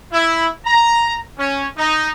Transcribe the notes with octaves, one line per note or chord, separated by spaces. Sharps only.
E4
A#5
C#4
D#4